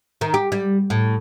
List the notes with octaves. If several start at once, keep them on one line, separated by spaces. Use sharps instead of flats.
D#3
G4
G3
A2